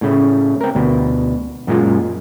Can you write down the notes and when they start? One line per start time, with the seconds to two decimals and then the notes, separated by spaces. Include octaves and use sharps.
0.01 A2 C#3 A3
0.61 C4 A#4
0.75 D2 B2
1.67 F#2 A#2 G#3 F4